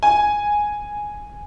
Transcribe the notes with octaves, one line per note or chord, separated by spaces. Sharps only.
G#5